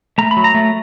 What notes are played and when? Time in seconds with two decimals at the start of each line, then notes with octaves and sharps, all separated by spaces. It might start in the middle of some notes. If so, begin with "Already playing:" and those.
0.18 A3 A#5
0.31 B5
0.37 F#3
0.44 A#5
0.54 A3